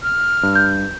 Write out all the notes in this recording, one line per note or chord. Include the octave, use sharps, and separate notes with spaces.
F6
G2
G6